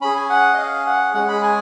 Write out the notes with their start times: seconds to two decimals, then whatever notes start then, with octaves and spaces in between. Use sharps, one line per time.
0.01 C#4 G#4 B5
0.16 G#5
0.30 F#5
0.54 D#5
0.58 F5
0.86 F#5
1.14 G#3 C#4 G#4 F#5
1.28 B5
1.43 G#5